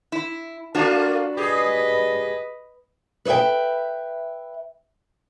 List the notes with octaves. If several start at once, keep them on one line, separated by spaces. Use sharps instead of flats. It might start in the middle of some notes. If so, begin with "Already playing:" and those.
E4
A3 A#3 D4 F4 F#4
G4 G#4 B4 D#5
B4 C#5 D#5 E5 G5